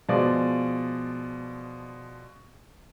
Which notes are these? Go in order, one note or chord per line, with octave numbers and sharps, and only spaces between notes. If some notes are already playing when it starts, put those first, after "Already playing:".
B2 F3 G#3 D5